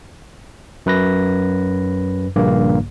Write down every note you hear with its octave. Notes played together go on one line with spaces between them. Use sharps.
F#2 B4 A#6
A#1 G2 C#3 A#3